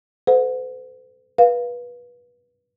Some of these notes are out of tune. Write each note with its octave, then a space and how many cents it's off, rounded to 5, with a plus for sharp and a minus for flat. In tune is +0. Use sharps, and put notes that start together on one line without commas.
A4 +0 C5 -45 F#5 -30
B4 -20 F5 +0